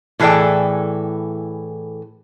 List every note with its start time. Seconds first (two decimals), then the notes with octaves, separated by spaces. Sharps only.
0.20 A2 E3 G#4 A4 D5 G5